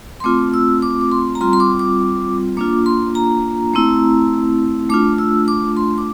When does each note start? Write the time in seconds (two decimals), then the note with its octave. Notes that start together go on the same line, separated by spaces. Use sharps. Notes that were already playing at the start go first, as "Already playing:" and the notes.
0.20 C6
0.24 A3 C4 F4 D6
0.54 E6
0.82 D6
1.01 D6
1.12 C6
1.35 A#5
1.41 G3 C4 F4 C6
1.53 C6
1.60 D6
1.79 D6
2.57 A#3 D4 F4 D6
2.86 C6
3.15 A#5
3.74 A3 C4 E4
4.89 A3 D4 F4 D6
5.18 E6
5.48 D6
5.77 C6
5.98 D6